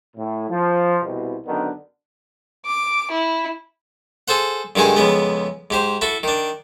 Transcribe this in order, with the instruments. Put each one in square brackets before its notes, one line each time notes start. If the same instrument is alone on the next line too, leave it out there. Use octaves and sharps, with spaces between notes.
[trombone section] A2
F3
C2 B2
F#2 D3 D#3 B3 D4
[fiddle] D6
E4
[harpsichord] G#4 A4 C5 F#5
G2 D3 D#3 G#3 G#4 G#5
F2 C#3 G#3 B3
G#2 G4 C5
E4 F#4 A4
D#3 D4